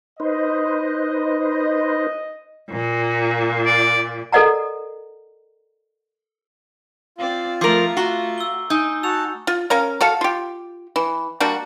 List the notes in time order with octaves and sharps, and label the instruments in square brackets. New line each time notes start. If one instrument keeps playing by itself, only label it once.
[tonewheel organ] D#4 B4 C5 [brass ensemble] D#5
[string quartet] A#2
[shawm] D5
[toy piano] A4 A#4 D5 D#5 F#5 A#5
[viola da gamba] C4 D5 [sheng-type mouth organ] F4
[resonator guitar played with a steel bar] F3 A#4 [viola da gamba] A3 [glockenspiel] D6 C7
[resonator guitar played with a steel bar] F#4 [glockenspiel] A#5 C#6 C7
[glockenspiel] E6 G7
[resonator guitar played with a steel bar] D#4 [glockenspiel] G#5 G6
[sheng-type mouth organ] F#4 A5 [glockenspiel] E6 F7
[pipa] F4
C#4 A#4 F5
F#4 A4 F5
F4 G4
E3
G3 A#3 D4 F#4